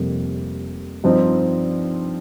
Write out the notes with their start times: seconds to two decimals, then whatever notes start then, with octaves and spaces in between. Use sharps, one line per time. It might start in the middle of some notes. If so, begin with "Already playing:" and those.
Already playing: F1 F2 C3 G3 A#3
1.04 G2 F3 C4 D#4